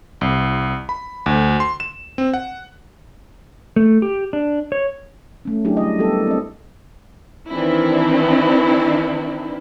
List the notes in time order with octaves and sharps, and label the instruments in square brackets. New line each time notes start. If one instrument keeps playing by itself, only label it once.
[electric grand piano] C2
B5
D2
C6
E7
C4
F#5
[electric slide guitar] A3
G4
D4
C#5
[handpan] A3 C#4
F#3 D4 E4 G4 G#4
G3 D4 D#5
G3 B3 G4 A4
E4 A#4
C4 D#5
[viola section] D#3 E3 C4 D4 E4